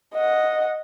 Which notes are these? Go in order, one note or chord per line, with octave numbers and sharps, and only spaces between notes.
D#5 F#5